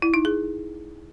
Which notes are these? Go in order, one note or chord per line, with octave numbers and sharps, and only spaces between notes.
E4
D#4
G#4